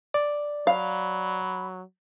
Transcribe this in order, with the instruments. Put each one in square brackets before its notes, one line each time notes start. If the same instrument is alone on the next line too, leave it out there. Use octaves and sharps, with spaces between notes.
[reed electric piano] D5
[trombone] F#3 [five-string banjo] F5 [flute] B5